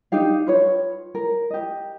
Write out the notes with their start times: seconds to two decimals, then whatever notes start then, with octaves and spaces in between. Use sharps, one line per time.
0.12 D4 D#4 G4 F5
0.46 F4 B4 C#5
1.15 A#4
1.50 G4 D#5